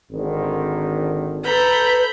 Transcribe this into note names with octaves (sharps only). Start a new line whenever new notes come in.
G#1 D3 D#3
A4 B4 A#5 B5 G6